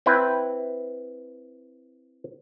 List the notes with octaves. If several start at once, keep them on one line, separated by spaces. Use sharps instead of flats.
C4 E4 B4